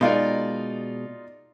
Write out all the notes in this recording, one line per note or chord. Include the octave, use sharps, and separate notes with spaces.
B2 G#3 D#4 F4 A#4 D5